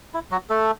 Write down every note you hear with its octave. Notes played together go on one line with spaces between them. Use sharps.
E4
F#3 F#4
A3 A4